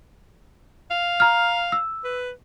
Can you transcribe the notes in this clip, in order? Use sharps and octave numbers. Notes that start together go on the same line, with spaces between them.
F5
A#5 F6
E6
B4